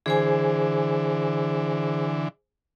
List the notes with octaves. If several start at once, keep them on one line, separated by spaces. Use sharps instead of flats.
D3 E3 G#4 C5 G#5